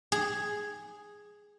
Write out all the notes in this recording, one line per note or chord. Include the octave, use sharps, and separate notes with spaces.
G#4